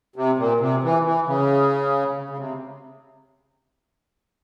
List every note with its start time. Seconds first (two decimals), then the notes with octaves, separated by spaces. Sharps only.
0.16 C3
0.38 A#2
0.60 C3
0.83 E3
1.05 E3
1.26 C#3
2.29 C#3
2.38 C3